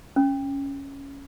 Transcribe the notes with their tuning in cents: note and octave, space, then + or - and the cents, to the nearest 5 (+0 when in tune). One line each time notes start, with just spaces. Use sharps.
C#4 +0